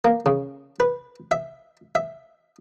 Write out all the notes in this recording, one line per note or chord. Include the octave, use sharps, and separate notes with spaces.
A#3
C#3
B4
E5
E5